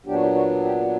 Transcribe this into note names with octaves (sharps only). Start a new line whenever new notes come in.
A#2 F#3 B3 D4 G4
F#4
G4
F#4
G4